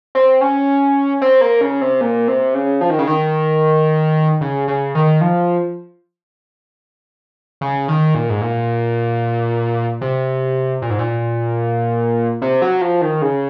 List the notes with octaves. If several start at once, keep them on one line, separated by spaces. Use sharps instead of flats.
C4
C#4
C4
A#3
C#3
C3
A#2
C3
C#3
F3
D#3
C#3
D#3
C#3
C#3
D#3
F3
C#3
D#3
A#2
G#2
A#2
C3
A#2
G#2
A#2
C3
F#3
F3
D#3
C#3